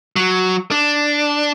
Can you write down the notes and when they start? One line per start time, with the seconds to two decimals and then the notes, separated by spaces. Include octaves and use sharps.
0.16 F#3
0.71 D4